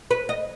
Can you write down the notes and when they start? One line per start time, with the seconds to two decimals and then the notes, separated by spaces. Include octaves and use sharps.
0.11 B4
0.29 D#5